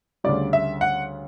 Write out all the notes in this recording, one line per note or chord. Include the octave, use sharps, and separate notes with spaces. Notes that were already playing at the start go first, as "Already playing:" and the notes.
D2 C#3 G3 D5
E5
F#5